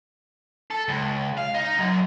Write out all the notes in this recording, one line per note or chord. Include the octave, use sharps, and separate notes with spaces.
A4
C#2
F5
D#4
F#2